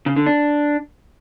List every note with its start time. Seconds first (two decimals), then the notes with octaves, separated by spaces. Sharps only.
0.06 C#3
0.16 D3
0.26 D4